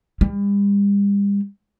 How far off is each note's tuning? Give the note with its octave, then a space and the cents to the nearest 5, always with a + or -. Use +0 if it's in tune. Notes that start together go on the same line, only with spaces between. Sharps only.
G3 +40